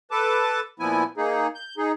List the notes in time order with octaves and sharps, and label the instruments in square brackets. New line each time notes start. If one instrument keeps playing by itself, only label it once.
[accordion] A4 B4 A5 D6
A#2 F3 B3 E4 G#5
A#3 D#4 G#4
G6
D#4 G#4